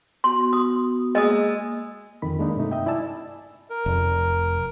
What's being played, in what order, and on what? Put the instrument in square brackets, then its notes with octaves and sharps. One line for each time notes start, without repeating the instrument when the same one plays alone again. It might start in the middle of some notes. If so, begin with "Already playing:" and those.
[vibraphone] B3 F#4 [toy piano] C6
[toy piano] D#6
[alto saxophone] G#3 [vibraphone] A#3 E6 [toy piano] D#5 D#6
[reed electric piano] F2 D#3 B5
G#3 A#3 D4 D#4
G2 C3 A3 D#4
D#5 E5 G5
E4 D5 G#5 A5 E6
[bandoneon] A#4
[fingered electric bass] F1